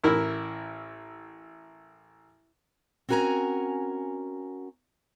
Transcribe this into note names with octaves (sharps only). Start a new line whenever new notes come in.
A1 E4 A#4
C4 C#4 F#4 A#4 G#5 A#5